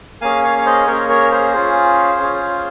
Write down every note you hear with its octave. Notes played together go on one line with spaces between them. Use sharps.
A#3 C#4 G#4 F5 G#5
C#5 F5
C#5
C5 D#5
A#3 C#4 G#4 A#4 C#5
A#4 C#5
G#4 C5
C#4 F4 G#4
C#4 F4 G#4